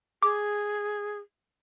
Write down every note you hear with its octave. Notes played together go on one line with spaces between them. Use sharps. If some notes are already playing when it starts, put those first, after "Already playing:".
G#4 D6